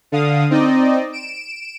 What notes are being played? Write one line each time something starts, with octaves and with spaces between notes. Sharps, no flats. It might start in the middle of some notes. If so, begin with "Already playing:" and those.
D3 F5 D#6
C4 D#4 D5 D#5
D7 E7